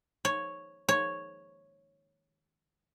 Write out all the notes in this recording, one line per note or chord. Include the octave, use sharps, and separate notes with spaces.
C#5
C#5